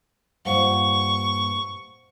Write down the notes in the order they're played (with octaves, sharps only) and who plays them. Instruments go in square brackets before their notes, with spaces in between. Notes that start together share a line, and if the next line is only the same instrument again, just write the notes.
[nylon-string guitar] G2 A#2 [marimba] C5 F5 F#5 [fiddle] C#6